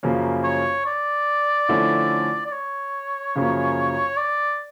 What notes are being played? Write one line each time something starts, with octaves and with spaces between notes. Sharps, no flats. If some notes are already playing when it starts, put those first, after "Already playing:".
F#2 C#3 F3 A#3 C#4
C#5
D5
D3 F3 A3 C#4 E4
D5
C#5
F#2 C#3 F3 A#3
D5